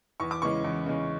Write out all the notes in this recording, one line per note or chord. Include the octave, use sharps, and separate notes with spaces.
E2 C#6
D6
C#3 E3 G#3 C#4 C#6
E2
C#3 E3 G#3 C#4